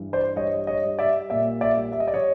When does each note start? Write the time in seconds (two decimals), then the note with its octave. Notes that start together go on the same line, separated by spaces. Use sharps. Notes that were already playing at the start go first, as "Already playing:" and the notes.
Already playing: G2 E3
0.13 C5 D5
0.36 G3 C#5 D#5
0.67 C#5 D#5
0.84 G3
0.99 D5 E5
1.30 A#2 D5 E5
1.61 D5 E5
1.77 G3
1.92 E5
2.00 D#5
2.08 D5
2.14 C#5 D#5